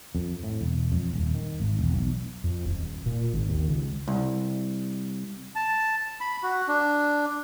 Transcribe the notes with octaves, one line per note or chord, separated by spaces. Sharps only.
F2
A2
E1
F2
D#1
D#3
G#1
E1
B1
F2
D#1
A#2
G#1
D#2
C#2
C2
A5
B5
F#4
D4